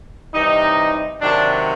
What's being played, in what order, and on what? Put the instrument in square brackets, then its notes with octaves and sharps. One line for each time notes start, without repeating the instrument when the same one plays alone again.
[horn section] C3 E3 G3 D#4
C3 D#3 F#3 D4